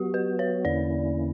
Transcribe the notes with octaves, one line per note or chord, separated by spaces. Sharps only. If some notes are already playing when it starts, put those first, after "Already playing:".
Already playing: F#3 B3 F#4 G4
B4
C#5
E2 D3 A#3 C#4 E4 D5